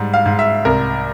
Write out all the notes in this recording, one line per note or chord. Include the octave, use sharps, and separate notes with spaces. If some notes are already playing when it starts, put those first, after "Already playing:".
Already playing: G#2 G3
F5
G#2
E5
C2 A#4